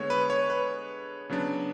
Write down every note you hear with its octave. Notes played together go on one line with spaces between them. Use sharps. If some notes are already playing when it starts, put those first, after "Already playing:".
Already playing: D3 G#3 B3 C#5
B4
C#5
B4
C#3 F#3 B3 D4